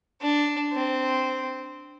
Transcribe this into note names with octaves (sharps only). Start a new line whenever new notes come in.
D4
C4